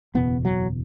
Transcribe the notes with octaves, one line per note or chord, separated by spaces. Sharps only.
F#1 E2 B2 B3
F#3